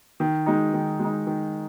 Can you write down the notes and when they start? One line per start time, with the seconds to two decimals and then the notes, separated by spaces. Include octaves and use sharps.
0.20 D#3
0.46 G#3 D#4
0.73 D#3
1.00 G#3
1.05 D#4
1.27 D#3